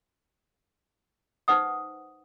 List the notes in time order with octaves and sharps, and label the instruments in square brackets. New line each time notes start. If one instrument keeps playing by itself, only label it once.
[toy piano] D#4 B4 C5 F#5 D#6